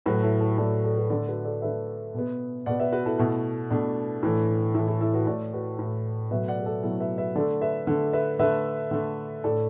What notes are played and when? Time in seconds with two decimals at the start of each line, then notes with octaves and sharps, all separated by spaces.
0.06 A2 F#3 A3 F#4 B4
0.23 E4 A4
0.40 E4 A4
0.58 A2 F#3 A3 A4 D5
0.84 A4 D5
0.97 F#4 B4
1.10 D3 A3 A4 D5
1.28 F#4 B4
1.44 A4 D5
1.62 D3 A3 B4 E5
2.14 B2 B3
2.66 B2 B3 D5 F#5
2.79 B4 E5
2.92 F#4 B4
3.06 E4 A4
3.18 B2 A3 E4
3.71 B2 A3 D4
4.23 A2 E3 A3
4.75 A2 E3 A3 E4
4.88 E4 A4
5.01 E4 A4
5.14 F#4 B4
5.27 A2 A3 A4 D5
5.53 F#4 B4
5.79 A2 A3
6.31 B2 F#3 A3 B4 E5
6.48 D5 F#5
6.60 B4
6.66 A4 D5
6.83 B2 F#3 A3 E4 A4
7.00 B4 E5
7.18 B4 E5
7.36 D3 A3 A4 D5
7.61 B4 E5
7.87 D3 A3
8.13 B4 E5
8.39 D3 A3 B4 E5
8.91 D3 A3
9.44 A2 A3 A4 D5